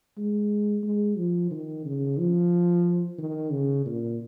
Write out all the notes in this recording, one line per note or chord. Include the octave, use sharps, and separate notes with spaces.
G#3
G#3
F3
D#3
C#3
F3
D#3
C#3
A#2